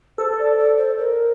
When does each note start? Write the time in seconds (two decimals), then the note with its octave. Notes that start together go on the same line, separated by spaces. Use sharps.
0.18 A4 C5
0.39 D5
0.58 D5
0.77 C5
0.98 A#4